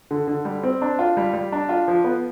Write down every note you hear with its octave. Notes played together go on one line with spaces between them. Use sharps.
D3
D3
G3
C4
D4
F4
G3
G3
D4
F4
F3
B3